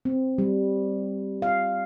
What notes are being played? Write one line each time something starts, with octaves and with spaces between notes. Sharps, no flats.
C4
G3
F5